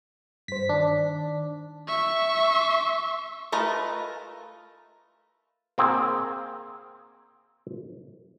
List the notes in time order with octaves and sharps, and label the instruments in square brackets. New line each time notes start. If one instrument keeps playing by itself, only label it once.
[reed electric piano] G2 C5 [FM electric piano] B6
[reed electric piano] D#3 [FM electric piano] D4
[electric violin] E5 C#6
[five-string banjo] A3 F4 A#4 B4 D#5
[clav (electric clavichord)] A#3 C4 G#4